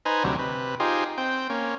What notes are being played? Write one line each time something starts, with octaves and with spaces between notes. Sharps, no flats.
D#4 B4 C5 G#5 A#5
D2 C3 F#3 G3
C3 B4
D#4 F4 G4 G#4 C5
C4 G5
A#3 C#4